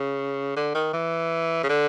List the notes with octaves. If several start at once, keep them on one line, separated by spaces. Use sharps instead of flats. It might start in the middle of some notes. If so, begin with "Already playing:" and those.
Already playing: C#3
D3
D#3
E3
C#3
D3